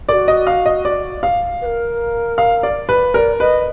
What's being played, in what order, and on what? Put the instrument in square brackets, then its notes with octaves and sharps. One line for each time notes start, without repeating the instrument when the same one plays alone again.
[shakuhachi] A#4 [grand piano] D5
[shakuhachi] F#4
[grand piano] D#5
F5
D#5
D5
F5
[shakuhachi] B4
A#4
[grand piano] F5
D5
B4
[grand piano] A#4 [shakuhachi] D5
[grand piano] B4 [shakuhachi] D#5